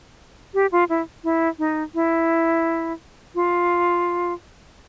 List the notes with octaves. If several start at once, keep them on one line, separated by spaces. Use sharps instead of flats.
G4
F4
E4
E4
D#4
E4
F4